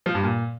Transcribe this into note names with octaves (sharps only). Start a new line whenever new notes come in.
F3
G2
A#2